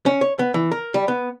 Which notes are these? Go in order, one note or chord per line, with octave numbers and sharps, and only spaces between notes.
C#4
C#5
B3
E3
A#4
G3
B3